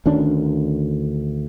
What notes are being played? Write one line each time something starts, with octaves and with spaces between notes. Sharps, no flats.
D2 D#3 C#4 D4